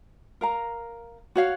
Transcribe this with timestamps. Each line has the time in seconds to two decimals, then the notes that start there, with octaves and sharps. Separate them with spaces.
0.41 A#4 F5 A#5
1.35 F#4 C#5 F5